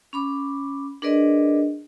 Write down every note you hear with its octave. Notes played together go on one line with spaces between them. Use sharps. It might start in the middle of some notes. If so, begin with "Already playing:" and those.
C#4 B5 D6
D4 G#4 A#4 B4 D5 D#5